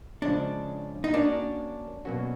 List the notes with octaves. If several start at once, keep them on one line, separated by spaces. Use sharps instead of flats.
C#3 F3 G#3 C#4 D4
D#4
A#3 C#4 D4 F#4 A#4 C#5
B2 F#3 A#3 C#4 F#4